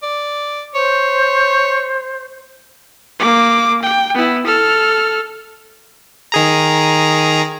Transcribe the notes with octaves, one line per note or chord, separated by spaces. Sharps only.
D5
C5 C#5
A#3 D6
G5
B3 E4
A4 F6
D#3 G#4 A#5